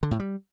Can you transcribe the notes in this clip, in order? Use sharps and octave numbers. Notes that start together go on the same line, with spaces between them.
D3
A2
G3